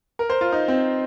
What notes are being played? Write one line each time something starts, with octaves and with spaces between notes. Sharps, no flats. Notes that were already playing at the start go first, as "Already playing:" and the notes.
A#4
C5
F4
D#4
C4